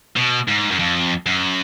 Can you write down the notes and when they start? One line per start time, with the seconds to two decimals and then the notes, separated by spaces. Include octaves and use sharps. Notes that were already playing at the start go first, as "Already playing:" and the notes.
0.16 B2
0.48 G#2
0.71 F#2
0.79 F2
1.26 F#2